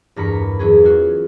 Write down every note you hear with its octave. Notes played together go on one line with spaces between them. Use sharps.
E2 G2 A#4 B5 C#7
E2 F#3 C#4 G#4
F4 F#4